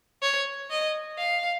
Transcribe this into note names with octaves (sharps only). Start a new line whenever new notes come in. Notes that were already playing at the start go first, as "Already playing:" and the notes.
C#5
D#5
F5